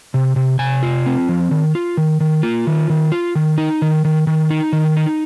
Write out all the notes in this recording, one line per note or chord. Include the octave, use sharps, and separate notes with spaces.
C3
C3
C3 G#5
F4
C4
F3
D#3
F4
D#3
D#3
A#3 F4
D#3
D#3
F4
D#3
D#4
D#3
D#3
D#3
D#4
D#3
D#4